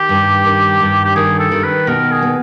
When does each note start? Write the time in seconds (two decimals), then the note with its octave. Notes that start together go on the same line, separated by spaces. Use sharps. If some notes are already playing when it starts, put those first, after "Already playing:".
Already playing: D#3 G4
0.09 G2
0.45 D#3
0.80 G2
1.05 G4
1.16 D#3 G#4
1.39 A4
1.51 D#3
1.63 B4
1.87 B2 A#4
2.11 G#4
2.22 B3